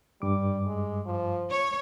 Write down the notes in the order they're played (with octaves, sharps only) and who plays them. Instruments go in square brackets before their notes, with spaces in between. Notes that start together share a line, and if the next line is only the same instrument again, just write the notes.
[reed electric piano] G2 D6 [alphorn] G3
[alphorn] G#3
F3
[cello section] C#5